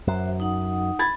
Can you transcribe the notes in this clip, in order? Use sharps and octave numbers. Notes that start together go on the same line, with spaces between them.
F#2 F#4 C5 E5
D#4 F#5 D#6
B5 G#6 A6